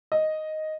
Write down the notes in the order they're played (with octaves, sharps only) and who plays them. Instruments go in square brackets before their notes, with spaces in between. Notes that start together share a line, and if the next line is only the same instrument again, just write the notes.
[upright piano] D#5